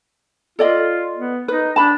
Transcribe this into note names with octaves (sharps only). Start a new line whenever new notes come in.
F4 A4 D5 D#5
B3
D#4 B4
D4 A5 B5